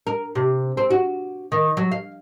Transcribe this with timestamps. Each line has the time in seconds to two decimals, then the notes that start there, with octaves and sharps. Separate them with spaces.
0.07 A#4
0.35 C3
0.77 C4
0.90 F#4
1.52 D#3
1.77 F#3
1.92 F5